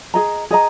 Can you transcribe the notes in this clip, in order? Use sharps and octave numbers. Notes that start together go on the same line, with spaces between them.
G#4 D#5 A#5
G#4 D#5 A#5